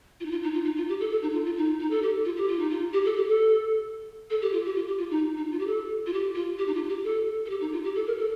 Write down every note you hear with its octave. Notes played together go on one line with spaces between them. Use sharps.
F4
D#4
F4
D#4
F4
D#4
F4
G4
A4
A4
D#4
F4
F4
D#4
D#4
A4
G4
F4
G4
F4
D#4
F4
G4
A4
G4
A4
A4
G4
F4
G4
F4
G4
F4
D#4
D#4
F4
G4
A4
F4
G4
F4
G4
D#4
F4
G4
A4
A4
G4
D#4
F4
G4
A4
A#4
A4